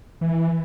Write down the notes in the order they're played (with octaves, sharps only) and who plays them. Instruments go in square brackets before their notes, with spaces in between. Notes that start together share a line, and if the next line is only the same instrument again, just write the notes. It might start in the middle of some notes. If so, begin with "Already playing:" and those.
[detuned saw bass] E3